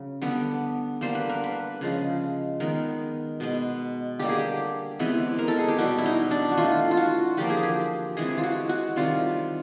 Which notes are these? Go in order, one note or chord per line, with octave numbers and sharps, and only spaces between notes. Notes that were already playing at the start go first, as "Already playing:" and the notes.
Already playing: C#3 F#3
D3 G3 B3
D3 G3 A#3 C5
B4
A#4
B4
C#3 F3 G#3
D#3 G#3 B3 A#4
B2 G#3 B3
D3 G3 A#3 G4
G#4
G4
C3 E3 G#3 B3
A#4
A4
G#4
G4
B2 G3 B3 F#4
E4
D#4
D4
F#4
E3 A3 F4
F4
F#4
D3 F3 A#3 G4
G#4
G4
C3 E3 G#3 G#4
F4
F#4
F#4
C3 D#3 G3 F4